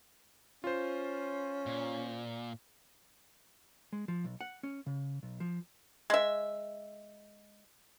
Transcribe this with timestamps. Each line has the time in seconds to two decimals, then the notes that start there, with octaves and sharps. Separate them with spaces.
0.64 C#4 F4 C5
1.66 A#2
3.93 G#3
4.08 F3
4.24 B1
4.41 F#5
4.63 C#4
4.86 C#3
5.23 B1
5.40 F3
6.10 G#3 E5